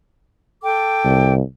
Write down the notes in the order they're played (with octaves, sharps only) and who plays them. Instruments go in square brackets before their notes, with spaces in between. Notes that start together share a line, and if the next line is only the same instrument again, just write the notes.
[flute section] A4 G5 D6
[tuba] C2